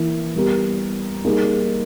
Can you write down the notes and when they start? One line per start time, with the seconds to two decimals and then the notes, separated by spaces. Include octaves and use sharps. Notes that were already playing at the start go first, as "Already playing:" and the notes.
Already playing: E3 A#3 E4
0.35 G3 B3 G4 A#4
1.25 G3 A#3 D#4 G#4